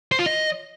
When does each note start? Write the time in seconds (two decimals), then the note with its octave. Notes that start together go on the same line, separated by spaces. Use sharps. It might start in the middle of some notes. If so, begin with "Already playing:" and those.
0.12 C5
0.19 F4
0.26 D#5